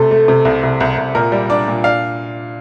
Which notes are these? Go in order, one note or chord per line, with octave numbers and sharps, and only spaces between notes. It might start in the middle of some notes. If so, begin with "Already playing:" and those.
Already playing: C3 A3 A4
A3
C3
C2
C2
C2
C2
A#2 A#4
G3
D4 D5
A#2
D4 F5